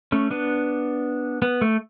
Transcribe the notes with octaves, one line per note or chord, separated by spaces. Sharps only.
A3 C#4
B3 D4
B3
A3